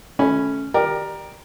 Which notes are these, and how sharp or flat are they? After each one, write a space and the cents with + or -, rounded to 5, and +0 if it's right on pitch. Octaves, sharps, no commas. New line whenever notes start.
A3 -25 C#4 -5 B5 +0
G4 +0 A#4 +10 D5 +30